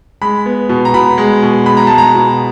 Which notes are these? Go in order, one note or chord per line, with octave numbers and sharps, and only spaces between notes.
G#3 B5
B3
B2
A#5
B2 B5
G#3
B2
G#3 B5
A#5
G#3 A5
A#5
B2